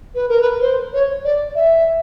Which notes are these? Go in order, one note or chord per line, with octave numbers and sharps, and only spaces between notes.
B4
A#4
B4
C5
C#5
D5
E5